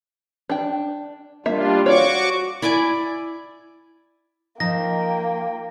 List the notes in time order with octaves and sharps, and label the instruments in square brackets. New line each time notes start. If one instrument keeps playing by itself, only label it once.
[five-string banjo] D4 G5
[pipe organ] G3 D4 F4 [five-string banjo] A#3 E5
[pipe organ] F#4 C#6 D6 [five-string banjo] C#5 D5 F5
[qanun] E4 D5 G#5 D6
[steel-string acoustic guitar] F3 [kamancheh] A#3 G5 [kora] D#4 [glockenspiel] A#6